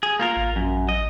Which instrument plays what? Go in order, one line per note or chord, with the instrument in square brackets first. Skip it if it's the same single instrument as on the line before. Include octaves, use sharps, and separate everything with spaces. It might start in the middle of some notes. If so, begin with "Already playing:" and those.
[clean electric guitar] G#4
A#3 F4 A#4
[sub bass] A1
[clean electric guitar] F#2
D#5